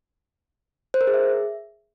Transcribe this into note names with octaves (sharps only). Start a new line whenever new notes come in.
C5
A#4
G#4
E5